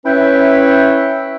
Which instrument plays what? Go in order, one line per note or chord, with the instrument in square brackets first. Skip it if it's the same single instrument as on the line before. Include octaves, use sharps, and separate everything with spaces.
[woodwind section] C#4 E4 B4 C#5 E5 G5